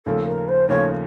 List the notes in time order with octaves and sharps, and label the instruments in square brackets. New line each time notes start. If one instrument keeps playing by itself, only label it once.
[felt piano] D#2 C#3 F3 A3 [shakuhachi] A4
[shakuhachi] A#4
C5
[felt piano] D#2 C#3 F3 A3 [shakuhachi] C#5